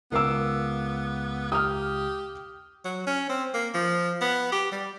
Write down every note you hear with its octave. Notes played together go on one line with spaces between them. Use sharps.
C#2 B3 A#4 F5 D6 E6
G4 D#6 F6
F#3
C#4
C4
A#3
F3
B3
G4
G3